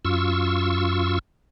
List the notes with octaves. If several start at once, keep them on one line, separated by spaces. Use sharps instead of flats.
F#2 F4 C#6 E6